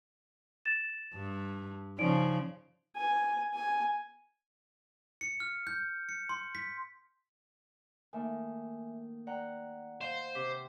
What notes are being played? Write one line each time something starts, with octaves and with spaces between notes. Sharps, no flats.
A6 E7
G2
C#3 F3 D#4 D5 D7
G#5
G#5
C#7
F6
G6
C#7
C6
B6
D#3 A3 A#3 E5 G#5
D5 F#5 G5 A#5
C5 D#5 F5
C3 D6 B6